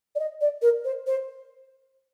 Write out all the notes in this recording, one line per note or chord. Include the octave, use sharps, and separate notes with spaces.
D5
D#5
D5
A#4
C5
C5